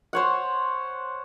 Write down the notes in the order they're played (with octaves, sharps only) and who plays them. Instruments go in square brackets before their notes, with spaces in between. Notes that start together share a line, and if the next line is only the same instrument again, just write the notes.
[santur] C5 C#5 F#5